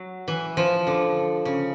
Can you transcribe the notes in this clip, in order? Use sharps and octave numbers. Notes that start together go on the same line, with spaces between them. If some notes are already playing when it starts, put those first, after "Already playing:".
Already playing: F#3
E3
F3
D3
C#3